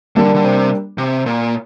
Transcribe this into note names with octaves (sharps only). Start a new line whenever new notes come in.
D3 G3 A#3 D4
D3
C3
C3
A#2